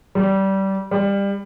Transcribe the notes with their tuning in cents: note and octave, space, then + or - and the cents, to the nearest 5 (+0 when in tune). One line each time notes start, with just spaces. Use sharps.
G3 -20
G3 +25